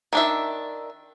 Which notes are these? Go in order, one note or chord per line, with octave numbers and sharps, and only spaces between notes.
D#3 D4 E5